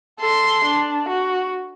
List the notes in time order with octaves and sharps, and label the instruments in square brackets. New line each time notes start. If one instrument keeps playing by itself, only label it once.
[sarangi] A4 [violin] C6
[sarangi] D4
F#4